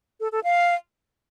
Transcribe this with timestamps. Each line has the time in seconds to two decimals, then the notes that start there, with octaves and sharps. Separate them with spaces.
0.20 A4
0.32 A4
0.44 F5